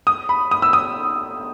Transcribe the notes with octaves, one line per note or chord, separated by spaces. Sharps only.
D#6
B5
D#6
E6
D#6